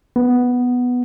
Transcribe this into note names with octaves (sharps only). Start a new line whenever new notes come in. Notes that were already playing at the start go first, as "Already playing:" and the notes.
B3